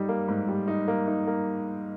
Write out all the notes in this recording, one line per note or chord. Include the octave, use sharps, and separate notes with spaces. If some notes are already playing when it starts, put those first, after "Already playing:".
Already playing: G3 D#4
A#3
G#2
G3
D#4
A#3
D#4
A#3